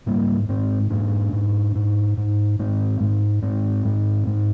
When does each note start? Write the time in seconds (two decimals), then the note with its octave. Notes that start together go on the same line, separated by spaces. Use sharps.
0.06 G#2 G3 A#3
0.49 G#2 G#3 C4
0.90 G#2 A#3 D4
1.33 G#2
1.75 G#2
2.17 G#2
2.59 G#2 G#3 C4
3.00 G#2
3.42 G#2 G#3 C4
3.85 G#2
4.27 G#2